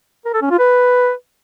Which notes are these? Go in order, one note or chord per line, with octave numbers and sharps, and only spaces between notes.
A#4
A4
C#4
F4
B4